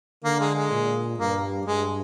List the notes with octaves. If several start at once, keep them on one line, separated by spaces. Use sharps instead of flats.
D3 A#3
G#3
G#3
A#2
G2 A#3
G2 G#3